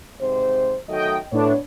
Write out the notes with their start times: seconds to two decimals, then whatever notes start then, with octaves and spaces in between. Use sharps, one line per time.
0.20 G#2 C3 C5
0.88 D#3 F#3 A3 D#5 G5
1.32 A2 B3 D4 C#5